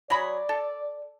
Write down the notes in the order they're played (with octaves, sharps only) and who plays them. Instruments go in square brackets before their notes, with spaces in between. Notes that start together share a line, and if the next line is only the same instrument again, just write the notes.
[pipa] F#3 G#4 B5 [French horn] D5
[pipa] A4